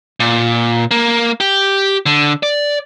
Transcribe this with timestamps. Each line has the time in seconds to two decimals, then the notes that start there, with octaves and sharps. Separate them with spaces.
0.20 A#2
0.91 A#3
1.40 G4
2.06 D3
2.43 D5